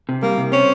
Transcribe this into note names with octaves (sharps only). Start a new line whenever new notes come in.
C3
G3 A#3
C3
C4 C#4